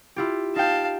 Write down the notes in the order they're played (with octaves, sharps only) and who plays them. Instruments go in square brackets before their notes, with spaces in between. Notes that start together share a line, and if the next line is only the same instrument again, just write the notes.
[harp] E4 F4 G4
[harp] D#4 G5 [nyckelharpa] F5 A5